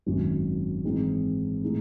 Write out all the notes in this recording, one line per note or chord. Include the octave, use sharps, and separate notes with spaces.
G#1 F#2 D#3 F#3
G#2 E3 G#3 C4 D#4
A2 G#3 D#4